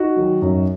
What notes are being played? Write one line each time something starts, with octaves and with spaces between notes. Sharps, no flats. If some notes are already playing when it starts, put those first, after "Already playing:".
Already playing: D#4 F#4
D#3 F#3
F#2